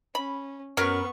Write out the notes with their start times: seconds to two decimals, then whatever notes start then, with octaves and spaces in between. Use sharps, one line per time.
0.15 C#4 B5
0.77 F#2 F#3 B3 A#4 B4 C#6 F6